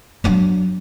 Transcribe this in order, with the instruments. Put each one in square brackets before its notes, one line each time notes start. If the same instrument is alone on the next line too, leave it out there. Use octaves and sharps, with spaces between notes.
[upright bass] F#3 D4